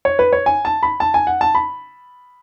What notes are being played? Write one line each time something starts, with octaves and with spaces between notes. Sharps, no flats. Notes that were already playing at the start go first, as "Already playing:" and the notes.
C#5
B4
C#5
G#5
A5
B5
A5
G#5
F#5
A5
B5